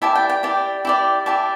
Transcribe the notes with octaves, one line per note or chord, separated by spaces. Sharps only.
E4 G4 D5 E5 A5
G5
G5
E4 G4 D5
E4 G4 D5
E4 G4 D5 E5 A5